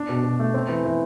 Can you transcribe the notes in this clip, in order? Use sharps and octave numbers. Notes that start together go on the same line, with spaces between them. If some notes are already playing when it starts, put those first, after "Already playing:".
Already playing: D4
B2
B2
A3
C4
E3
E3